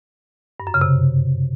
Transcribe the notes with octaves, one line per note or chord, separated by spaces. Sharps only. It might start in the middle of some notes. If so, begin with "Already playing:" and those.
G2
F#2
C#3
C3